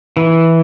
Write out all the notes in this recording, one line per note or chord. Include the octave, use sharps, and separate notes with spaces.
E3